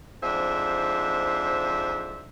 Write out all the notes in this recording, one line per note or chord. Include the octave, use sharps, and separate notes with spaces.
F2 G#2 D4 C5 E5